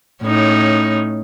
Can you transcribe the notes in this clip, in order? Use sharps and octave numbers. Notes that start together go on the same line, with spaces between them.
A2 C#4 D#4